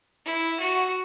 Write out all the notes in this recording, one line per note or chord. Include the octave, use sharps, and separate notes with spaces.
E4
F#4